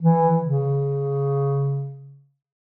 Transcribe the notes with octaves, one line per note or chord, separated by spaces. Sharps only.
E3
C#3